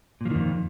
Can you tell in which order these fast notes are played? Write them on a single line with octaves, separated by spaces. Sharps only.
A#2 F3 D#3 F2